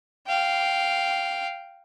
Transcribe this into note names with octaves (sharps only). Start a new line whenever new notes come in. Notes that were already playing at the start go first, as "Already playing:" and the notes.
F5 G5